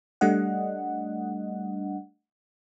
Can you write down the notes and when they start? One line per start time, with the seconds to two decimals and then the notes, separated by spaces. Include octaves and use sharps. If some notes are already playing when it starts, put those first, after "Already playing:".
0.21 G3 A3 D4 D#5 F#5